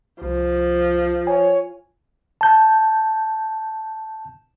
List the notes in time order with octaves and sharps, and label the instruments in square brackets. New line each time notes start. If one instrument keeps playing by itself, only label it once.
[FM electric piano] C2 [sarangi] F3
[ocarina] C#5 [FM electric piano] G#5
[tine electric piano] A5 G6